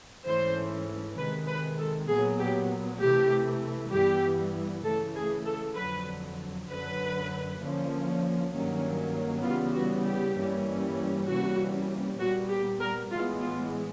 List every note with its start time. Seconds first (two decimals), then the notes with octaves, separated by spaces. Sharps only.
0.25 G#2 E3 A3 C#4 C5
1.17 C3 D#3 G#3 B4
1.48 B4
1.78 A4
2.08 A#2 F#3 B3 G#4
2.39 G4
3.01 C3 E3 A3 G4
3.92 G2 E3 G3 B3 G4
4.84 C#3 E3 A3 A4
5.14 G#4
5.45 A4
5.76 F2 D3 F#3 B4
6.68 F#2 D3 F#3 B4
7.60 D3 F3 A#3 C#4
8.52 G2 D#3 F#3 A#3 C#4
9.43 C#3 E3 G3 B3 F4
9.73 F#4
10.05 G4
10.35 G2 E3 G3 A#3 C#4
11.27 C3 E3 G3 A#3 C#4 F#4
12.19 A#2 G3 B3 F#4
12.50 G4
12.80 A#4
13.10 A2 E3 G#3 B3 F4
13.41 F4